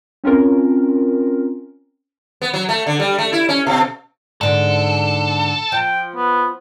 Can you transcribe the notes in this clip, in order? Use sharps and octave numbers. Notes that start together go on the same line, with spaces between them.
C4 C#4 F4 A#4
B3
F#3
A3
D3
G3
A3
E4
C#4
B2
G#2 D3 A4
F3 G5
B3